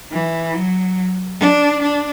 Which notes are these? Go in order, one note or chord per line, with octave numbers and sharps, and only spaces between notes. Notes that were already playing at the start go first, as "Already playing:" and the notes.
E3
F#3
D4
D4